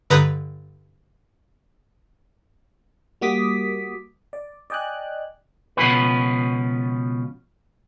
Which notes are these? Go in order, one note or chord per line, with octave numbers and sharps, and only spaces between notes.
G2 D3 B4 A#5 D#6 G6
G3 A#3 F#4 D6 D#6 B6
D5
D5 D#5 G5 G#5 F#6
C#2 B2 D#3 F3 C#4 B4